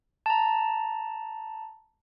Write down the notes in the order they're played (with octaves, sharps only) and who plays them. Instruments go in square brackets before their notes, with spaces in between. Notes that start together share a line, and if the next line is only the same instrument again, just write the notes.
[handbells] A5 A#5